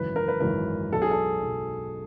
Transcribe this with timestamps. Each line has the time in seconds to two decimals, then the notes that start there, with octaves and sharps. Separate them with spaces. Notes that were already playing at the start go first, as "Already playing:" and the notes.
Already playing: G#1 F#2 C#3 E3 B4
0.16 A#4
0.28 B4
0.40 G#1 F#2 C#3 E3 A#4
0.92 B1 B2 A4
1.02 G#4
1.11 A4
1.43 B1 B2